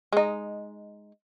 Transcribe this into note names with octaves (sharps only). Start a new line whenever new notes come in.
G#3 D#4